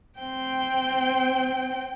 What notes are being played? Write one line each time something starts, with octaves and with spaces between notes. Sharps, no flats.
C4 G5